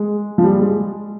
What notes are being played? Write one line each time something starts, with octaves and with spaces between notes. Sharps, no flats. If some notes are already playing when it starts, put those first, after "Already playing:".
Already playing: G#3
F3
G3
G#3